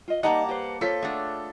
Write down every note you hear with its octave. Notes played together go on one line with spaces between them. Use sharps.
F4 D#5
G3 A#3 D#4 D#5 F#5 A5 A#5
G4 B4 C5
F4 A4 C5 C#5 F5 B6
A3 D4 G#4 C#5 F#5